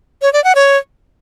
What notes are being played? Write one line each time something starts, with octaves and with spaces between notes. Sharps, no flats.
C#5
D5
F#5
C#5